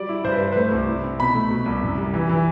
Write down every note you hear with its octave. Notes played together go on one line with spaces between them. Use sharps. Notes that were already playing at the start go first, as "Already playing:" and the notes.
Already playing: F#3 G3 D5
E4
G2 C5
B4
G3 C5
B4
A3 C5
C2
E4
C4
B2 B5
A3
B2
C2
F#2
G3
E3
E3